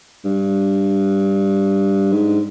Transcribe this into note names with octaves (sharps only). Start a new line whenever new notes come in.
G2
G#2